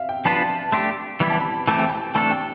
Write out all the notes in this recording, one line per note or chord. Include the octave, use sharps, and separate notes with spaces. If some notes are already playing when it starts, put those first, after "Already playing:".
Already playing: E5 F5
G5
F3 B3 D4 F4 B4 A5
A3 D4 G4 C6
E3 G3 B3 E4 G4 B5
A5
B5
E3 A3 C4 G4 A5
G5
A5
E3 A3 D4 A4 A5
G5